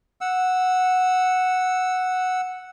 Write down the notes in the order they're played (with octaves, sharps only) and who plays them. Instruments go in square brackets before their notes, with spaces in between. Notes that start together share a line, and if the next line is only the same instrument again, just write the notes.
[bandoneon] F#5 E6